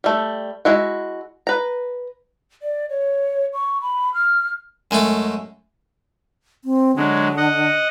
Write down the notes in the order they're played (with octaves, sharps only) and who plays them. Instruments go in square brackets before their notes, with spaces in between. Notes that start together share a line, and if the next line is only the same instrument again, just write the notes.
[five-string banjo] G3 A3
G#3 E4 F#4
B4 A#5
[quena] D5
C#5
C#6
B5
F6
[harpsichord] F#2 G#3 A3 A4
[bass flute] C4
[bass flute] D3 [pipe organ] F#3 G#3
[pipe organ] D#5 F#5